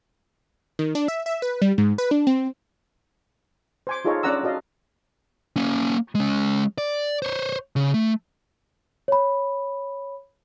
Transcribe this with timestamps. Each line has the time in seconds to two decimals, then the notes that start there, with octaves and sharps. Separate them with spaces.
0.79 D#3
0.95 D4
1.08 E5
1.26 E5
1.42 B4
1.62 G3
1.78 G#2
1.98 B4
2.11 D4
2.27 C4
3.87 C5 G#5 D6
4.05 D#4 F4 G#4 A4 C#5 D#5
4.23 C#4 D4 D5 F#5 A#5 E6
4.44 F#4 A4 D#5 F5
5.56 A#3 C#4
6.15 G#3 C#4
6.78 D5
7.22 C5 C#5
7.76 C#3
7.94 A3
9.08 C#5 B5